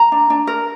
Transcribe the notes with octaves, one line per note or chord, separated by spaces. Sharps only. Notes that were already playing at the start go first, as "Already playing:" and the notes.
Already playing: A#5
D4
D4
A#4